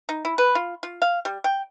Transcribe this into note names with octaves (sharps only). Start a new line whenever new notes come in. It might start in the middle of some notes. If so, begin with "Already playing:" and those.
D#4
E4
B4
F4
F4
F5
G3
G5